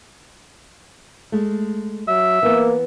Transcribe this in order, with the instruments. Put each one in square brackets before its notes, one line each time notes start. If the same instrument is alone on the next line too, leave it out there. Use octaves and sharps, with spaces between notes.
[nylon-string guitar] G#3 A3
[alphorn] F#3 [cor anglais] E5
[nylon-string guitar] E3 B3 [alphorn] A#3